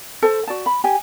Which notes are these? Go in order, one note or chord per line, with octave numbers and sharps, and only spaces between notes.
A4 C5 A5
F#4 D5 A5
B5
G4 G#5